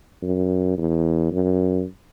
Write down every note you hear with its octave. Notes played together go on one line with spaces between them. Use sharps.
F#2
E2
F#2